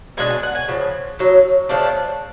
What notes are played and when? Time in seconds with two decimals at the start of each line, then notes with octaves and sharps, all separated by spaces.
0.17 B2 G#3 D4 G#5
0.30 G#5
0.43 F#5
0.55 G#5
0.68 C#3 F3
1.19 A2 F#3
1.69 C#3 F3 A3 D4